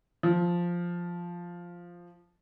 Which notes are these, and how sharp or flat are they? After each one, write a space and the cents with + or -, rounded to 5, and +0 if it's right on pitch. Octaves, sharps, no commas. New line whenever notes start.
F3 +0